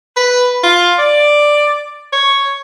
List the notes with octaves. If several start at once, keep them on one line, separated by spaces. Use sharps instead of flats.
B4
F4
D5
C#5